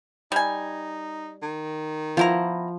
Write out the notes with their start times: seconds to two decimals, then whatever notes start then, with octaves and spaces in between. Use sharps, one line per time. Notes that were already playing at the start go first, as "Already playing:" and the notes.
0.32 G3 D#4 G#5
1.43 D#3
2.17 F3 B3 E4 A#5